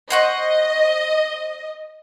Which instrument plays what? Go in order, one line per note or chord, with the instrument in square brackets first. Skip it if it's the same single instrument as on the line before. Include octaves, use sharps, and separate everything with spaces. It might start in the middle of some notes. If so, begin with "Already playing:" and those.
[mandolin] C5 F#5 C#6 [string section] D#5